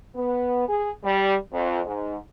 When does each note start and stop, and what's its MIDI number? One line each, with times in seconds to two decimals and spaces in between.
0.15 0.63 59
0.67 0.91 68
1.03 1.35 55
1.52 1.80 41
1.85 2.17 44